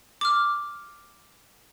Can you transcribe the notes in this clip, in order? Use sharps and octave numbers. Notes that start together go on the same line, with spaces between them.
D6 F6